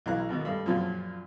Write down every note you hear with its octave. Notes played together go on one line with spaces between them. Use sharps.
B1 E3 F5 A#5 F#6
G#2 B2 D#3
G2 A3
F#2 A#2 C#3 F3